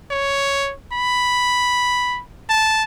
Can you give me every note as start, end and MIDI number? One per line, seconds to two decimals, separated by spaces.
0.11 0.73 73
0.92 2.21 83
2.50 2.83 81